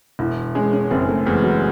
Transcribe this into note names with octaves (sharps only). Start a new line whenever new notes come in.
E1 E4
G#3 C#4
C#4
F#1 C4
A3
E2 G#3
F#3